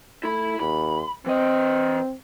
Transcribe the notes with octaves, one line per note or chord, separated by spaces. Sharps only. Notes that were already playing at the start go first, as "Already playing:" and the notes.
A3 E4 B5
D#2 B5
E3 C4 D#5